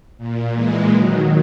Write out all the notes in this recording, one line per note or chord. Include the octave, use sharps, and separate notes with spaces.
A#2
E3 G#3
D#3 F#3